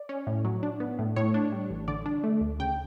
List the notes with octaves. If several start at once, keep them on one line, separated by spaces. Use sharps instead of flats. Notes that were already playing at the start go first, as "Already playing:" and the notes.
Already playing: D5
C#4
A2
F#3
D4
B3
A2
A2 C#5
D4
G3
A1
D3 D5
D4
A3
D2
C#3 G5